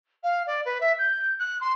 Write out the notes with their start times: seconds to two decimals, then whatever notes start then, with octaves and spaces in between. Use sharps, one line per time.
0.23 F5
0.46 D5
0.65 B4
0.80 E5
0.98 G6
1.39 F#6
1.60 C6